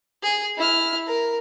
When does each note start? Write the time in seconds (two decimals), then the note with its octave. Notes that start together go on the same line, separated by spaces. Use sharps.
0.23 G#4
0.57 E4 F6
1.06 A#4